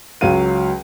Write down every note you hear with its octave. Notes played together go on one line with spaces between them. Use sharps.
C#2 F#3 F5 D#7